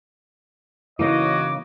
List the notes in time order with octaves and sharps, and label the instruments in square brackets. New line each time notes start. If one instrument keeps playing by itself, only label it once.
[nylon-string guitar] C#3 A#3 D#4 [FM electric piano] E3 [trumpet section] F#4 C#5 D#5 [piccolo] D6